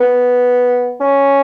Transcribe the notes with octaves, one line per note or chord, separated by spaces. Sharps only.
B3
C#4